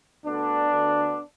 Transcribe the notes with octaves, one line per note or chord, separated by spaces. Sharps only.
D2 D3 B3 D4
D2 D3